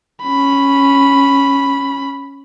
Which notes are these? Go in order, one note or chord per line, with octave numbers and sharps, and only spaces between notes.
C#4 B5